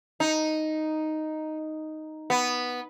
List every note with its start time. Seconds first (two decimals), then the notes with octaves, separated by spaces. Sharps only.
0.20 D#4
2.30 B3